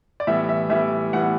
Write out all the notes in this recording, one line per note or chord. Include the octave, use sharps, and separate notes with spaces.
D5
A2 E3 G3 B3 E5
E5
A2 E3 G3 B3 E5
A2 E3 G3 B3 F#5